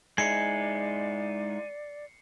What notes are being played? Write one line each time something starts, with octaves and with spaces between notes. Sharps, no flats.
G#3 D#4 E4 D5 G#5 C7 C#7